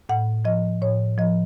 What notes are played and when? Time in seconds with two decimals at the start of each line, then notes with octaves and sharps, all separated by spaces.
0.09 A2 F#5
0.45 F3 D#5
0.82 A2 C#5
1.18 F3 D#5